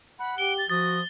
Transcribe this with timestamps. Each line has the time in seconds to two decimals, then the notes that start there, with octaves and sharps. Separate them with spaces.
0.19 F#5 B5
0.38 G4 D7 G7
0.58 A6
0.70 F3 F#4 D#6 A6